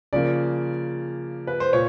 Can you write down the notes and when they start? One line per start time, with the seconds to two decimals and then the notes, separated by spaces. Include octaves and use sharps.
0.13 C#3 F3 A#3 D5
1.47 B4
1.60 C5
1.73 A#2 C#5